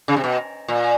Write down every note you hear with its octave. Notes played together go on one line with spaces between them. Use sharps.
C#3
C3
B2
A#2